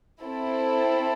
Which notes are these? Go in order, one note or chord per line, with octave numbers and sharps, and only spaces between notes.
C4 E4 A4